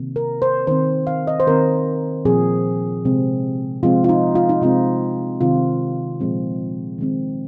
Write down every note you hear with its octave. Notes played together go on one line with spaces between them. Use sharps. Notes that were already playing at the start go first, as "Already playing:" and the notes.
Already playing: C3 D#3 A#3
A#4
C5
D#3 C4 C5
F5
D#5
C5
D#3 C4 A#4
A#2 F3 C4 G#4
C3 G#3 C4
C3 F3 G#3 C4 F4
F4
D#4
F4
D#4
C3 G#3 C4 F4
C3 D#3 C4 F4
A#2 F3 G#3 C4
D#3 G#3 C4